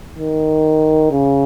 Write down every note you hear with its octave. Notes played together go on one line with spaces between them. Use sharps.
D#3
C#3